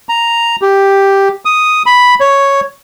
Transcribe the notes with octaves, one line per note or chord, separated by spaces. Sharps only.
A#5
G4
D#6
B5
C#5